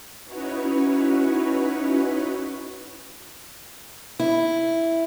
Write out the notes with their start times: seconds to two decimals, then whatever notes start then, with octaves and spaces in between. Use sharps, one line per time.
0.25 C#4 D#4 E4 F#4 B4 C#5
4.20 E4